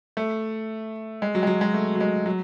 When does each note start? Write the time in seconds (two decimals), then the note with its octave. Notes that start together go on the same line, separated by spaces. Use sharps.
0.17 A3
1.22 G#3
1.35 F#3
1.43 G#3
1.47 F#3
1.61 G#3
1.74 A3
1.95 F#3
2.01 G#3
2.26 F#3